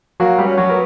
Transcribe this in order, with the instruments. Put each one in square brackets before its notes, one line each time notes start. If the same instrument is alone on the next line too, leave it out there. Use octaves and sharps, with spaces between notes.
[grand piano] F#3 F#4 [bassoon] A#3
[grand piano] G3 G4
[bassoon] C#4
[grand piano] F#3 F#4
[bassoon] B3 [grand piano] A#4